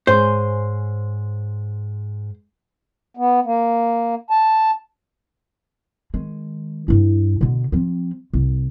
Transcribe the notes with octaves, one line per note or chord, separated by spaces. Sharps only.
G#2 C5 C#5 G#5
B3
A#3
A5
D#3 G#3
G2 E4
B2 D3
F3 C4
C2